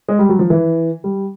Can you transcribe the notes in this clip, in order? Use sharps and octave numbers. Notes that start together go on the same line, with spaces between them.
G#3
G3
F#3
F3
E3
G3